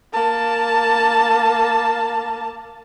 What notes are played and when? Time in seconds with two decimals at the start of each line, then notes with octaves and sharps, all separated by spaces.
0.13 A#3 A5